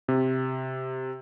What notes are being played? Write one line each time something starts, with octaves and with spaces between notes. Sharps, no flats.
C3